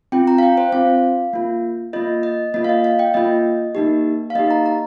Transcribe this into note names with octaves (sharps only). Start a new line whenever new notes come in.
C4 F4 G5
A#5
F5
G5
C5
C4 F4 F5
A#3 F4
A#3 F4 D#5
D#5
A#3 F4 D#5
F5
D#5
F5
G5
A#3 F4 D#5
A#3 D#4 G4
F5
A#3 D#4 G4 D#5
A#5
A#5